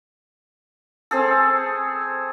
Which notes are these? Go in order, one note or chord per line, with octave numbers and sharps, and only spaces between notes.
C4 G#4 A4